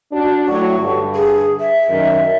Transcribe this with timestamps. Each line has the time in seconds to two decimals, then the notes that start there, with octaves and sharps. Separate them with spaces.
0.12 D4 F#4
0.48 A2 F#3 C#6
0.78 G2 D3
1.15 G#4
1.60 E5
1.89 F#2 D#3